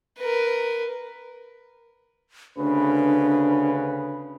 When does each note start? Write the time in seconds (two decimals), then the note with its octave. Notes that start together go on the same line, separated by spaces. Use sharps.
0.19 A#4 B4
2.57 D2 C#3 D4 B4